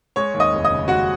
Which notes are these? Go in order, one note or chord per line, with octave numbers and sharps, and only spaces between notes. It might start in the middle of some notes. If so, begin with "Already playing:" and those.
G#3 C#5 C#6
D#2
D#5 D#6
F1
D#5 D#6
C#3
G#3 F#4 F#5